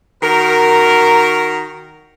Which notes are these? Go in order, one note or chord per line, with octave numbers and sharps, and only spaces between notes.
D#3 F#4 A#4